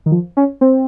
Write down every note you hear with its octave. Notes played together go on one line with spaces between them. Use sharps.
D#3
F3
C#4
C4